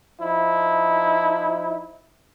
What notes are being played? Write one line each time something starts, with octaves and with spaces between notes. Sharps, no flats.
F3 D#4 E4